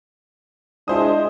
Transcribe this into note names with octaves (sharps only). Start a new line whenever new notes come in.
G#3 D4 E4 C5 D#6